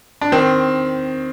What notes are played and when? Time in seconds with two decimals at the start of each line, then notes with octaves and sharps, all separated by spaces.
0.21 D4
0.32 D#3 C4